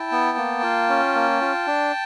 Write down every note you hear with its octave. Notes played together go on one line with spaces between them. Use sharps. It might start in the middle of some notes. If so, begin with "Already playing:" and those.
Already playing: E4 G5 A5
B3
A#3
F4
C#4
A#3
F4
D4